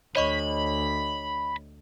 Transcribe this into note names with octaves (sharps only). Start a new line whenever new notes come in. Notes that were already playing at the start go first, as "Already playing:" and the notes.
D2 C#5 D#5 B5 C#6